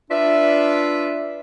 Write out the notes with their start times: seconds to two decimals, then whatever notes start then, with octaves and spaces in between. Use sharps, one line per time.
0.11 D4 F4 B4 D5 E5